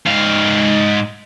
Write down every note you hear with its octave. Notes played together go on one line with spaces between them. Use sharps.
G#2 F5